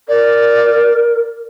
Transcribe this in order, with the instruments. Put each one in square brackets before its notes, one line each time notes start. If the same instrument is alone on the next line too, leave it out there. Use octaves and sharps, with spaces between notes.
[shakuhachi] A#4 [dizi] D5